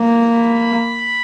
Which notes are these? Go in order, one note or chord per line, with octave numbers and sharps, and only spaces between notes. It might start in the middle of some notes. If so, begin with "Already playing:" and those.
Already playing: A#3
B5